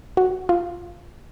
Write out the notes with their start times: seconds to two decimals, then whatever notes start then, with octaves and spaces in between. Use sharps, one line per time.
0.17 F#4
0.49 F4